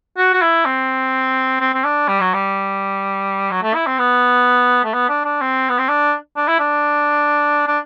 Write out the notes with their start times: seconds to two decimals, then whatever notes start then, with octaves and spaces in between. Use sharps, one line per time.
0.17 F#4
0.34 F#4
0.42 E4
0.65 C4
1.60 C4
1.74 C4
1.84 D4
2.08 G3
2.20 F#3
2.34 G3
3.51 F#3
3.63 A3
3.74 E4
3.86 C4
3.98 B3
4.84 A3
4.93 B3
5.09 D4
5.25 D4
5.41 C4
5.69 B3
5.78 C4
5.89 D4
6.36 D4
6.48 E4
6.59 D4
7.67 D4